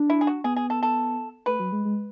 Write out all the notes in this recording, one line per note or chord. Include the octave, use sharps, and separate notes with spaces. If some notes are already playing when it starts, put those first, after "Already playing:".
Already playing: D4
E4
G#4
F#4
B3 G#4
G#4
A4
A4
A3 B4
F#3
G#3
G#3